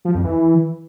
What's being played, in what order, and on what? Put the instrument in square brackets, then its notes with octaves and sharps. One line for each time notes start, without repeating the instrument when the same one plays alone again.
[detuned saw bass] F3
F2
E3